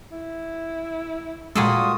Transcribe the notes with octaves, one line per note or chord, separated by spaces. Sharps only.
E4
A#2 G3 G#3 F4 F#4 G#4 A4 D#6